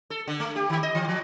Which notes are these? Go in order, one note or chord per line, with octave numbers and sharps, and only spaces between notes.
A4
D3
A3
G4
D#3
D#5
E3
F3